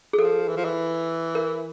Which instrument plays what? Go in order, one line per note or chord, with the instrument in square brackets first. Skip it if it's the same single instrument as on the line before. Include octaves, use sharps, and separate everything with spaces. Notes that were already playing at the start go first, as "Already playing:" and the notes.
[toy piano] G#4
[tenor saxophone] F3 [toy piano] A4
[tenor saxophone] E3
F3
E3
[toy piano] A#4